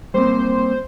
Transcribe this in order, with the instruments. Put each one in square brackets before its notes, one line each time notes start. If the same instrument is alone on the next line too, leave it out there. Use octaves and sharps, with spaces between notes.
[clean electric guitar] G3 A#3 C4 [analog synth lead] C5